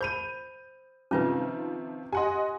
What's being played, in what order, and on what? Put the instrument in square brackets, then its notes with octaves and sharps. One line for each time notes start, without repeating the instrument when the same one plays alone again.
[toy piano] C5 B5 [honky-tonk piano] G6 D#7
[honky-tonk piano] C3 D#3 F3 [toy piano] C#4 F4 B4
[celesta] G4 C6 [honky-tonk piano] D#5 F#5 G#5